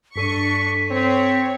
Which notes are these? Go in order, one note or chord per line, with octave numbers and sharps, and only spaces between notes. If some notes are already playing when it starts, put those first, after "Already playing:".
G2 D4 A4 C#6 B6 D#7
C4 C#5